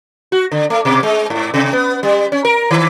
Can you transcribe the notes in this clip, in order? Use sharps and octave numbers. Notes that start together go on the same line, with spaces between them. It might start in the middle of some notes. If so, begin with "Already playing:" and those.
F#4
D3
A3
B2
G#3
G#2
C3
B3
G3
C#4
A#4
D#3